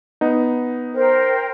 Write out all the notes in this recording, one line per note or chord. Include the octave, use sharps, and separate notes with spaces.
B3 D#4
A#4 C5 G5